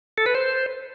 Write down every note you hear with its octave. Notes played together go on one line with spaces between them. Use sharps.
A4
B4
C5